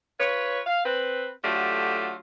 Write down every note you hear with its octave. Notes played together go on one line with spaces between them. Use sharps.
F4 B4 C#5
F5
C4 B4
D3 F#3 A3 F4 G4